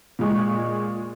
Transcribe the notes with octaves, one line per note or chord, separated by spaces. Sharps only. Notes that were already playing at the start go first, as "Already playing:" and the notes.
A#2 G#3 C#6